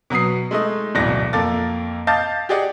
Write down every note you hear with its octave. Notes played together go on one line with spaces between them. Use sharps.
B2 F#3 B3 D#6 C7
G#3 A3 D#4 D#5
D1 A1 B2 D5 A#6
F2 A#3 A4 D6 A6
D#5 F5 A5 D6 G6 A6
G4 G#4 D5 D#5 F#5